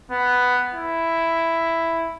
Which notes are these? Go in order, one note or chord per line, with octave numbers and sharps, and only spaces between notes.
B3
E4